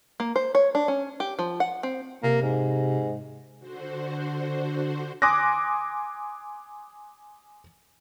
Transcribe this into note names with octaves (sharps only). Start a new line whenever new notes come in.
A#3
C5
C#5
D4
C#4
G4
F3
F#5
C4
C3 A#3
G#2
D3 F#4 C5
G#5 C6 D6 D#6 F#6 A#6